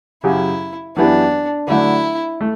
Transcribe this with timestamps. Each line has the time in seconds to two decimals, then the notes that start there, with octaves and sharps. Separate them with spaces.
0.24 F#2 C#3 F#3 C#4 E4 G4
0.97 F#2 E3 B3 D4 E4 G4
1.68 D3 F#3 A3 D4 E4
2.41 A3